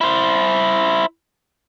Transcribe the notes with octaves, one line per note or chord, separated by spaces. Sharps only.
E4 C5